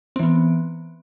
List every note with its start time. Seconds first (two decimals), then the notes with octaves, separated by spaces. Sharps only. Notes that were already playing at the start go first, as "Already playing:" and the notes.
0.16 C4
0.19 E3
0.23 B3